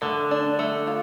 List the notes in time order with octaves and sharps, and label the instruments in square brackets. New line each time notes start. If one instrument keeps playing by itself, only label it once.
[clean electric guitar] D3 [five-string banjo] A3
[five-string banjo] D4
A3
F4